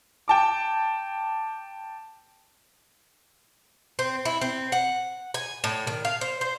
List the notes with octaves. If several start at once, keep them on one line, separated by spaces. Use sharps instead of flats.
G5 A5 D6
C4
E4
C4
F#5
G#5
A2
D#3
F5
C5
C5